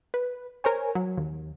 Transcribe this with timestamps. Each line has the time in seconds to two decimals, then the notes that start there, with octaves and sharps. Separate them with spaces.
0.14 B4
0.64 A#4 C5 C#5 G#5
0.95 F#3
1.17 D#2